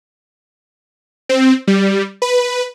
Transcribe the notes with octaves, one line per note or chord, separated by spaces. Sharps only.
C4
G3
B4